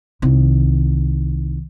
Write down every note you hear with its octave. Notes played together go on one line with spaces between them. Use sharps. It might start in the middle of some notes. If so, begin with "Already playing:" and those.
C2 D#3